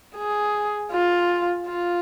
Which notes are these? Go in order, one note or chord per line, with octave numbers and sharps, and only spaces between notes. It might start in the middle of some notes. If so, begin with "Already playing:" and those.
G#4
F4
F4